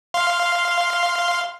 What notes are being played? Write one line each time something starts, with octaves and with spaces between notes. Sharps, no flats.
F5 C6